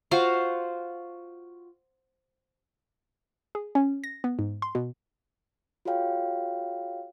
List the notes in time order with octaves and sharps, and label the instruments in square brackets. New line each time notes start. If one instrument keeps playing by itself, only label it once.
[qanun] F4 F#4 C5 F5
[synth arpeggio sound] G#4
C#4
A#6
B3
G#2
C6
B2
[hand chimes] F4 F#4 G#4 C#5 F5 G5